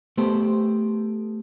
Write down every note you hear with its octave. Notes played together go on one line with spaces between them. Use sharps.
A3 B3 G4 A4 C5